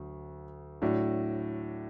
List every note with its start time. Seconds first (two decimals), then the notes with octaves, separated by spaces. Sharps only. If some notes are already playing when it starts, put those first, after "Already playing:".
Already playing: D2 F#3
0.82 A2 F#3 D4 F#4